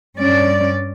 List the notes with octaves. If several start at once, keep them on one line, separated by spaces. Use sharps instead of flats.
G2 C#4 D5